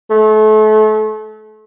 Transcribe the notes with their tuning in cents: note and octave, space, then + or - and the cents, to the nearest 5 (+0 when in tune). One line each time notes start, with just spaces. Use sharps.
A3 -35